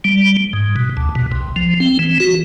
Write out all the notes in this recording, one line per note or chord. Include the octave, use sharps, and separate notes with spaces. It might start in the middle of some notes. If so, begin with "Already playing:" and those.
G3
G#2
B2
D2
B2
C2
F3
C4
E3
F#4